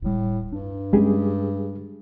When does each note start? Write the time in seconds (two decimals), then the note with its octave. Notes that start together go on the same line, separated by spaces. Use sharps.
0.02 D1 A2 G3
0.52 G2 D4
0.93 G3 G#3 B3 C#4 G4 G#4